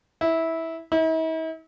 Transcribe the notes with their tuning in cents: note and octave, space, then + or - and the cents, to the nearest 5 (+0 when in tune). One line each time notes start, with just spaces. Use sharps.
E4 -15
E4 -45